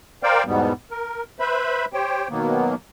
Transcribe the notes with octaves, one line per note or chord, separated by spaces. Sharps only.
A#4 C5 D5 F5 G5
E2 G#2 B2 G3 B3
A#4
B4 C5 E5 B5
G4 C5 C#5 G5
B2 D#3 F#3 A#3 B3